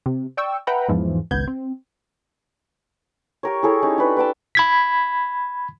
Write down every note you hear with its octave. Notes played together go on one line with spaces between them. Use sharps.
C3
D5 G5 C#6 E6
B4 E5 F#5 G5 A#5 B5
E2 G#2 E3 F3
G#1 C#2 B3 G6 G#6
C4
G4 A#4 C#5
E4 G#4 A4 C#5
C#4 D#4 G4
D4 B4
B4 D5 G5 A5
B5 G#6 B6